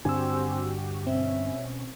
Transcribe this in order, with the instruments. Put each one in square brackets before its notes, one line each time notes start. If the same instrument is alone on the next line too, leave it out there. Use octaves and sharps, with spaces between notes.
[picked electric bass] G2 D3 D4 [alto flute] C4 [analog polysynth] F#4 G4 [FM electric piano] G#5 E6
[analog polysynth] B2 C#4 [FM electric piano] C4 [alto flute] E5